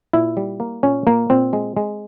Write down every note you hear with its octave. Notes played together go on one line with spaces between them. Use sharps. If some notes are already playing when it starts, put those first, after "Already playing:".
A#2 E4
G3
A#3
A#2 C#4
A#2 A#3
A#2 C4
G#3
G#3